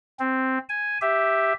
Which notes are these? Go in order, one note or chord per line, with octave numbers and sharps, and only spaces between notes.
C4
G#5
G4 E5